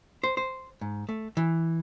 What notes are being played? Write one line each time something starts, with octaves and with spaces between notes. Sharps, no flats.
C5
C5
G#2
A3
E3